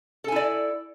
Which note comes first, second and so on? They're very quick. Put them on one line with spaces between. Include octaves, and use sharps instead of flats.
A4 G#5 E4 D5